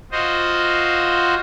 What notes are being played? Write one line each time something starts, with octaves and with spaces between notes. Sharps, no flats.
F4 F#4 C5 D#5